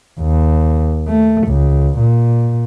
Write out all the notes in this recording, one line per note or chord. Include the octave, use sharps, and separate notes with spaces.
D#2
A3
C#2
A#2